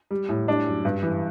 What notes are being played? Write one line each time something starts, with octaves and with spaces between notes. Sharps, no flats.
G3
A2
G3 D4
F#2
G2
E3